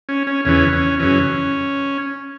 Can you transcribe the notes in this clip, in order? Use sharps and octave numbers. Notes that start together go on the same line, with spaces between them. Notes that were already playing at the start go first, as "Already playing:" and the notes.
C#4
C#4
E2 C#3 E3 C#4
C#4
F#2 C#3 E3 C#4